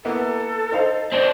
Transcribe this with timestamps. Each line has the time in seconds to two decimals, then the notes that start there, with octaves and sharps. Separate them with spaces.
0.05 A#3 B3 E4 A4
0.72 D#4 C5 F5
1.12 C4 D4